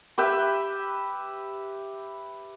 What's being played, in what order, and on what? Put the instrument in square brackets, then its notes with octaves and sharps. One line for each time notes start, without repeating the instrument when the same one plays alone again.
[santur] G4 B4 E5 G5